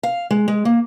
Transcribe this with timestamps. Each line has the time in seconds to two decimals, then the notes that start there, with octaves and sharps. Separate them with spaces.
0.03 F5
0.31 G#3
0.48 G#3
0.65 A#3